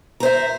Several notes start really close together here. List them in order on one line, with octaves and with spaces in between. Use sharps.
A#5 C5 E5